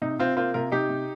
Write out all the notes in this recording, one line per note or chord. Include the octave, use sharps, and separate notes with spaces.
C3 D#4
C3 C4 F4
A#3 C4 F4
C3 F4 A#4
C3 D#4 G4
C3